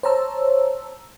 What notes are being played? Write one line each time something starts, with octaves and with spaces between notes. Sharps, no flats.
C5 C#5 A5 A#5 E6